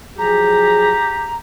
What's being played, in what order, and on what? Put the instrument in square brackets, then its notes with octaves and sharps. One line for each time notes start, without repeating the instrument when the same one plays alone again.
[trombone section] F3 F#3 G#4 [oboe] G4 [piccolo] A#5